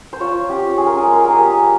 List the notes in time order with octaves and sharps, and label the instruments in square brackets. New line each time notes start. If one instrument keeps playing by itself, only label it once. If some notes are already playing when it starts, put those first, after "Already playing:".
[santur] C5
F4 C#5
C#4 G4
C#4 G#4
A#4
G#4
G#3
A#4
G#4
A#3 G4
A#3